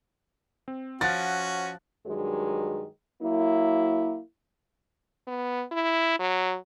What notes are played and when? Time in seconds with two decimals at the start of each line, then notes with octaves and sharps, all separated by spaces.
0.68 C4
1.01 F3 C#4 F#4 F#5 F#6 A6
2.07 G2 D#3 F#3 G#3
3.23 F#3 A#3 E4
5.27 B3
5.72 E4
6.19 F#3